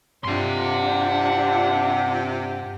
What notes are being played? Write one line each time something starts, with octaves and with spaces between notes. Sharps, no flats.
G2 C3 D4 F4 F#5 C6